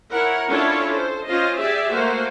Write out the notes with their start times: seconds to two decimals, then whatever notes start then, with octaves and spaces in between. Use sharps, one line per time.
0.11 E4 A#4 C#5 F#5
0.49 C#4 D4 E4 F4 A4 C#5
0.91 A4 C5
1.27 C#4 F4 C5 D#5
1.58 G4 G#4 D5 E5
1.91 A3 A#3 F#4 C5